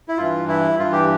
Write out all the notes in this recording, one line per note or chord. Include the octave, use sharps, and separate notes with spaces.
E4
G2 E3 F4
E4
G2 E3 F4
G4